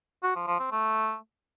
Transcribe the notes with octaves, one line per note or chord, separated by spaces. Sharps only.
F#4
F3
F3
C4
A3